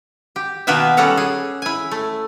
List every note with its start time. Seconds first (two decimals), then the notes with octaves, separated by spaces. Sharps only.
0.36 G4
0.67 B2 D#3 A#3 B3 B4 E5
0.97 G3 C#4 A4 F#5 A#5
1.17 G#4
1.62 E4 G#5
1.91 A3